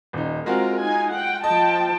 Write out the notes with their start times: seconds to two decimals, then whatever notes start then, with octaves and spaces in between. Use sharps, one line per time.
0.13 D#1 D#4
0.46 G#3 C4 F4 F#4 A#4
0.81 D#4 G#5
1.13 F#5 G5
1.44 F3 D#5 G5 A5